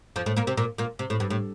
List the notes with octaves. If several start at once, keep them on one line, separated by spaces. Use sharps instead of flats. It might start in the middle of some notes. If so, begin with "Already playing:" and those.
F2 F3
A2 A3
A#2 A#3
C3 C4
A#2 A#3
A#2 A#3
C3
A2
G2
A2